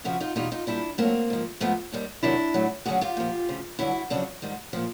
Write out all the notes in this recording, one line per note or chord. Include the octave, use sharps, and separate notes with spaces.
F2 C#3 F3 E4 F#4
D#4 F4
E2 B2 G3 D#4 F4
D#4 F4
A#2 G3 D4 E4
A2 F#3 A#3 C4
G#2 F3
G#2 F3 A3 B3
D#2 D#3 G3
E2 C3 D#3 F#3 D4 E4
A2 F#3
D2 C#3 F#3 F#4 G#4
F4 G4
A#2 F3
D2 C#3 F3
G2 D3 F#3 E4 F#4
F2 C#3 F#3 D4 E4
G#2 D#3 G3
A#2 F3